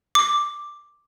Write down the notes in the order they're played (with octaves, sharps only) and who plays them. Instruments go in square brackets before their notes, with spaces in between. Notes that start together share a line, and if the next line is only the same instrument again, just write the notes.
[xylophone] D6